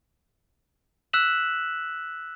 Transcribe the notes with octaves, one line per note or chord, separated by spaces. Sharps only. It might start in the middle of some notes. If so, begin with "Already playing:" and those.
E6 F#6 B6 E7 F#7